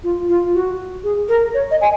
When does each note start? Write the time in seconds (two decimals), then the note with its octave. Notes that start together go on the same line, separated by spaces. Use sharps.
0.04 F4
0.29 F4
0.54 F#4
1.04 G#4
1.29 A#4
1.54 C#5
1.71 D#5
1.81 G#5